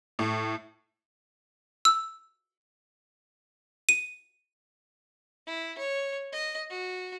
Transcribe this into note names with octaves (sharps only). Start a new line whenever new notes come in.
A2
E6
D#7
E4
C#5
D#5
F#4